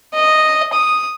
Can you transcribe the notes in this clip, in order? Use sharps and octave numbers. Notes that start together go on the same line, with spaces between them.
D#5
D#6